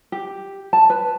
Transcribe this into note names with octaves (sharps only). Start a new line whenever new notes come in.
G4
A5
B4